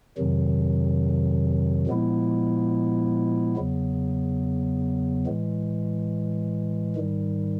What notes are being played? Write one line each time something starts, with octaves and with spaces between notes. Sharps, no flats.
F2 C3 D#3 F#3
A#2 F3 G#3 B3 E4
E2 C#3 F#3 B3
A2 E3 G#3
G#2 D#3 G3